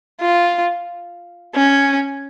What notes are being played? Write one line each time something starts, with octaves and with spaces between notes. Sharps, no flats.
F4
C#4